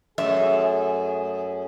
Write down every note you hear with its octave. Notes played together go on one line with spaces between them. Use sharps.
F#2 A3 G#4 E5